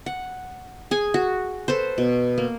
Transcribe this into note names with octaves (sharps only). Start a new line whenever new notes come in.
F#5
G#4 G#5
F#4
A4 B4 C5
B2
A#3